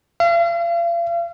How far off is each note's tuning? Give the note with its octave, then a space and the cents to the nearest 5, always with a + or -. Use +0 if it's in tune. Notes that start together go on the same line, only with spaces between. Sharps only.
F5 -40